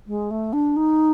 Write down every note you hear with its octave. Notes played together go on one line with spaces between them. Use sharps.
G#3
A3
D4
D#4